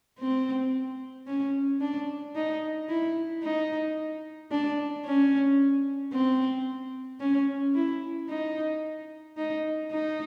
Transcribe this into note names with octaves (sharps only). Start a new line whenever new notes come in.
C4
C#4
D4
D#4
E4
D#4
D4
C#4
C4
C#4
E4
D#4
D#4
D#4